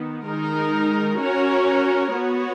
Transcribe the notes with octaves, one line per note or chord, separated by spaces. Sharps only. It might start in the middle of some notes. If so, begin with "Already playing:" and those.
Already playing: D#3 B3
D#3 G#3 D#4 A#4
C#4 F#4 A#4 C#5
B3 F#4 C#5